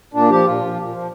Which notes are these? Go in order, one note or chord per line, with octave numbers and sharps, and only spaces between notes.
A#2 D4
F3 G4
A#2 F4
F3
A#2
F3